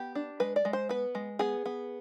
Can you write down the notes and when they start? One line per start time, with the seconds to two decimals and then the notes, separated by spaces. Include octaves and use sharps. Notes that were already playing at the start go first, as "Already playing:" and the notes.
Already playing: B3 G4
0.15 D4
0.40 G#3 B4
0.56 D5
0.65 G#3
0.73 C5
0.89 B3 B4
1.15 G#3
1.39 B3 G#4
1.66 B3